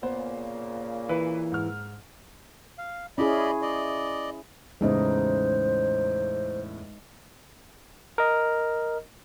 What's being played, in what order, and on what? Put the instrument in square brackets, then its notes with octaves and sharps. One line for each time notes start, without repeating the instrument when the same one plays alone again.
[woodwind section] A#2 C#3 A#3 [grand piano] B3 C5
[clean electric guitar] E3 [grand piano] B4
[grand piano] G#2 F6
[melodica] F5
[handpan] C#4 E4 G#4 [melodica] D5 D#5 B5
[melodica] D5 D#5
[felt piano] E2 A2 C#3 [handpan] G#3 D#4 D#5 [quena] C5
[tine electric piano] A#4 D#5